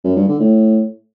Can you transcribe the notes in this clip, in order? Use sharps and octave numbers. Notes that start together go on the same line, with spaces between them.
F#2
G2
D3
A2